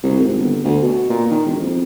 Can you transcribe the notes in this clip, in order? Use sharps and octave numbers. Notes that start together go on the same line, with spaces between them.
C2
G#1
G1
D2
B2
A#2
D#3
E1
F2